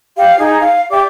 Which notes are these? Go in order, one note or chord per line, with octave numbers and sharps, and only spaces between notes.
G4 F5
D#4 G#4
F5
G4 D5 E5 D6